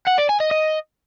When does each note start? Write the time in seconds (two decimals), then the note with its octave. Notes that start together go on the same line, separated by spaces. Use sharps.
0.07 F#5
0.18 D5
0.29 G#5
0.40 D#5
0.51 D#5